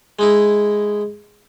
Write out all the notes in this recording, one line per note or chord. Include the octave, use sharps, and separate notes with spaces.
G#3 D#4 E4